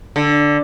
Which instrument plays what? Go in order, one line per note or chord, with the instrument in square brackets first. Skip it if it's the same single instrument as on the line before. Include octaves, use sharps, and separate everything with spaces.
[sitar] D3